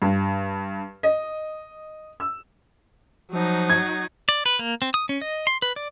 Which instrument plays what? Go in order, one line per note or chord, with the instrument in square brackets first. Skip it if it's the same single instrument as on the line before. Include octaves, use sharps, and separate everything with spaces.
[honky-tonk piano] G2
D#5
E6
[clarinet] F3 [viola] F#3 D#4
[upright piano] G#6
[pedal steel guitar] D5
B4
A#3
C4
D#6
C#4
D#5
C6
B4
D5